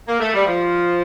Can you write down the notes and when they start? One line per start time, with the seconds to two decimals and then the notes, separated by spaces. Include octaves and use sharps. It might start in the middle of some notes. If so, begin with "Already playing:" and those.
0.08 A#3
0.20 A3
0.33 G3
0.46 F3